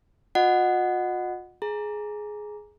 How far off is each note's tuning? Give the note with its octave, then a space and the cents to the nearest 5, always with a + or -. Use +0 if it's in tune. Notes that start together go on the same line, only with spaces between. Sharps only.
F4 +45 D#5 -20 F#5 +0
G#4 +15 A#5 +5